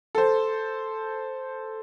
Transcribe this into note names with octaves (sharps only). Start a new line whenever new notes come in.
A4 C5